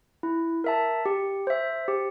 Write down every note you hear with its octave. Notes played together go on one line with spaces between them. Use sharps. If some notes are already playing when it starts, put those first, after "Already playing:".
E4
A#4 E5 A5
G4
C5 E5
G4